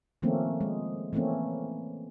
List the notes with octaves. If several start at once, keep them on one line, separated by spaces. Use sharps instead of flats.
D#3 F3 A3 A#3 C4 C#4
G#3
E3 A3 A#3 C4 C#4